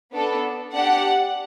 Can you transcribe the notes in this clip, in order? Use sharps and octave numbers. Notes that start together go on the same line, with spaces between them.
B3 D4 A4
D4 G4 F#5